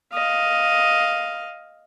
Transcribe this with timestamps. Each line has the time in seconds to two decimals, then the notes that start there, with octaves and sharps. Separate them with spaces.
0.13 D#5 F5